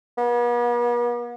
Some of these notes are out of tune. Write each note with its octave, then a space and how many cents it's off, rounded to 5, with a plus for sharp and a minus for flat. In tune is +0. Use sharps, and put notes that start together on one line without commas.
B3 -45